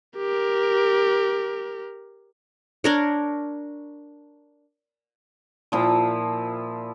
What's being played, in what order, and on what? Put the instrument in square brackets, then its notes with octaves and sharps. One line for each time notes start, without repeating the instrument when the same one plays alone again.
[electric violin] G4 A#4
[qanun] D4 A#4 C#5
[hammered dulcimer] A#2 F3 E4